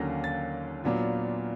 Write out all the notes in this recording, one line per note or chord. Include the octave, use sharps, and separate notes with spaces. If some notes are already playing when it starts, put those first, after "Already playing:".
Already playing: D#2 D3 F#3 A#3 C#4 A#6
A6
A#2 F#3 B3 D4 F4